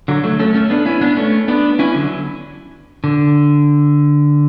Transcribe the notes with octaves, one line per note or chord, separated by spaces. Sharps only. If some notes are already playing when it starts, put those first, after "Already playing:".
D3 F#3
F#3 A3
A3 C#4
A3 C#4
B3 D4
C#4 E4
B3 D4
A3 C#4
B3 D4
C#4 E4
D3 F#3
D3